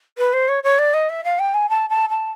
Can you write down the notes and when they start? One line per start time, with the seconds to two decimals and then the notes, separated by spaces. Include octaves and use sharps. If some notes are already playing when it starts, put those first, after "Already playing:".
0.18 B4
0.33 C5
0.48 C#5
0.63 C#5
0.78 D5
0.93 D#5
1.09 E5
1.24 F5
1.39 G5
1.54 G#5
1.69 A5
1.89 A5
2.09 A5